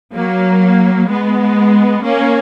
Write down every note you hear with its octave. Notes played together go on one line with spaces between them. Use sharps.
F#3 A#3
G#3 B3
A#3 C#4